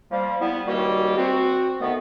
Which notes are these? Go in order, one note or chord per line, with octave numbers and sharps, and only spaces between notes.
F3 G3 A#3
G3 B3 E4
C#2 D#3 G3 A#3 F#4 G4
C4 F#4
D2 D#3 A3 B3